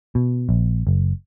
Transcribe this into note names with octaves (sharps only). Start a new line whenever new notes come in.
B2
A#1
F#1